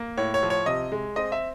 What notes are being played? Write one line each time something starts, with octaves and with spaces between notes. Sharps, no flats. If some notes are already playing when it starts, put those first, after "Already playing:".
Already playing: A#3
A2 C#5
C#5
F3
C#5
C3 D#5
G#3
C4 D#5
E5